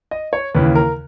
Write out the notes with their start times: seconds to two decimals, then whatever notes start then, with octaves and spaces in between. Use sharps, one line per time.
0.11 D#5
0.33 C#5
0.54 D#2 C#3 E3 B4
0.75 A#4